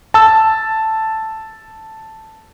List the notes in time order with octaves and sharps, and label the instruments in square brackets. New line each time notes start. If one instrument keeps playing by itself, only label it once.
[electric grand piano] A5 E6